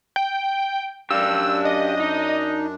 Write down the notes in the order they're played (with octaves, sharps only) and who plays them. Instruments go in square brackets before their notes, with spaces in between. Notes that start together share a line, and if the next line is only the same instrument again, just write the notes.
[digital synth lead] G5
[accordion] F#2 D4 [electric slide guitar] G4 F5 [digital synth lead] E6
[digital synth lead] D#5
[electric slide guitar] D#4